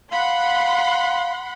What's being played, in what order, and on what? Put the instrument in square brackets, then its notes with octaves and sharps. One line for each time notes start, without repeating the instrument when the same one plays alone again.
[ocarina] F5 [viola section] F#5 B5 C6